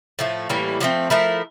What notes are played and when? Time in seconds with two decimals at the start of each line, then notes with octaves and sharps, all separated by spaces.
0.19 A2 F3 A3
0.49 A2 E3 G3 A#3
0.80 D3 F3 A3 C4
1.10 F3 A3 E4 A#4